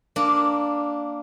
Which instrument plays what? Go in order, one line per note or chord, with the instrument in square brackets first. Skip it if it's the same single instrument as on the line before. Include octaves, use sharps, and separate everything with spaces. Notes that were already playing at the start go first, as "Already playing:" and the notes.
[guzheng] A#3 D4